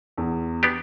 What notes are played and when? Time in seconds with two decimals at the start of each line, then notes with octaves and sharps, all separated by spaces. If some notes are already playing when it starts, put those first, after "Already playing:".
0.18 E2
0.63 B3 D4 G4